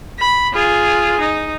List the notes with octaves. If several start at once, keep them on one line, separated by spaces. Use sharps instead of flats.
B5
F4 G#4
D#4